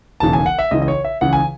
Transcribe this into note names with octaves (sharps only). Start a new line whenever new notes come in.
E1 D#2 C#3 E3 A5
G#5
F#5
E5
C#2 C#3 E3 D#5
D#5
C#5
E5
C#2 C#3 E3 F#5
G#5